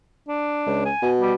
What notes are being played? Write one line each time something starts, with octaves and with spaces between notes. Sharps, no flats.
D4
C#2
G#5
B2
G3